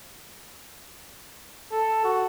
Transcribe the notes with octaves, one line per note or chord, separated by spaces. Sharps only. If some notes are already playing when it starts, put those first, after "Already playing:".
A4
F#4